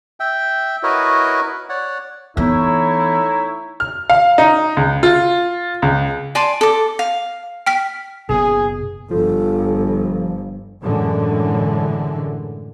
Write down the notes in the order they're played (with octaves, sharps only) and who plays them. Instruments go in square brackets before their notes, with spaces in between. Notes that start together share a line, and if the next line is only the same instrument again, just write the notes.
[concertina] E5 G5
E4 F#4 A#4 B4 C#5 D#5
C#5 D5 F#5
[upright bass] E3 B3 [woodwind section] A3 D#4 E4 [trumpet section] C#5 A#5
[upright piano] F6
F5
D#4
C#2
F4
C#2
[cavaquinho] D5 G#5 A5 C6
A4 D6
F5
[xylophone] G5 F6 B6
[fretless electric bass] F#1 B2 [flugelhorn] G#4
[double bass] G1 [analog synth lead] F3 [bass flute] A4
[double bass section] F#2 A2 D3 E3 G#3